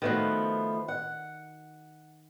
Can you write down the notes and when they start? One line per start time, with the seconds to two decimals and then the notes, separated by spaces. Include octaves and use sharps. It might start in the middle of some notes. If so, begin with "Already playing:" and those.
0.02 D#3 F3 A3 B3 F#4
0.88 F#5